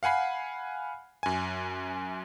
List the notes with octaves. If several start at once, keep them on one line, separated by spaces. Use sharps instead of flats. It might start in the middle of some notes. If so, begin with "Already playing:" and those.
F5 F#5 G#5 B5 C7
F#2 G#5